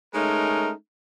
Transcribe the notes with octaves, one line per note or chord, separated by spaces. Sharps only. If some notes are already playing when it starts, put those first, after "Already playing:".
G#3 A3 C#4 D#4 A#4